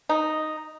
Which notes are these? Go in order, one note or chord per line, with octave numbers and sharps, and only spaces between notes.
D#4